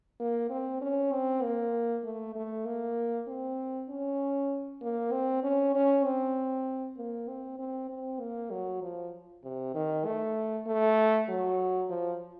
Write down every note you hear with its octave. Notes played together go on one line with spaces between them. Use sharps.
A#3
C4
C#4
C4
A#3
A3
A3
A#3
C4
C#4
A#3
C4
C#4
C#4
C4
A#3
C4
C4
C4
A#3
F#3
F3
C3
D#3
A3
A3
F#3
F3